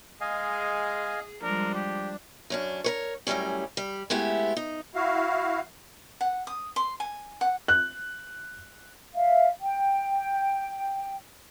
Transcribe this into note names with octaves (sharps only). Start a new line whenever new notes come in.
G#3 G#4 D#5 F5 G#5
F3 G3 G#3 D4 A#4
G4
F#2 C#4 D4
A#4 B4 C#5
F#2 A2 D3 G3 C#4
G3
G#3 A3 B3 E4 G4
D#4
E4 F#4 F5
F#5
D#6
C6
G#5
F#5
F#6
E5 F5
G5